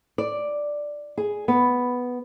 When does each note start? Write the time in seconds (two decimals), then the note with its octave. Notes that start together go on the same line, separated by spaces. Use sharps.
0.18 D5
1.18 G#4
1.48 B3